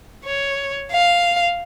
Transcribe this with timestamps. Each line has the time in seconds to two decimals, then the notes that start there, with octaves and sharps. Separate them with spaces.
0.25 C#5
0.92 F5